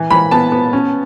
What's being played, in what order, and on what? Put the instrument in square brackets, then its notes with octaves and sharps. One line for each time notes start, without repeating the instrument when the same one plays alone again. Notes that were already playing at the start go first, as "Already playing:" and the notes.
Already playing: [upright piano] E3
E3 B5
B3 A5
B3
C#4